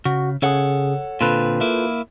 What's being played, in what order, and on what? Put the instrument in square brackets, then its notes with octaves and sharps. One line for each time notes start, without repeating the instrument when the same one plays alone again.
[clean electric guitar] C#3 [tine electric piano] F#4
[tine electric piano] C#3 G#4 [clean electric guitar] A4 C#5 F#5
[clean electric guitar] A#2 D3 C4 [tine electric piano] F4 A4 B4
[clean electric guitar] A#3 E4